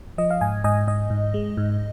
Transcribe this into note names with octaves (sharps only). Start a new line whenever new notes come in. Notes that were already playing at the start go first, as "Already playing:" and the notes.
F3 D#5
F5
G#2 D#5 G#5
G#2 D#5 G#5
G#2 D#5
G#2
G#3
G#2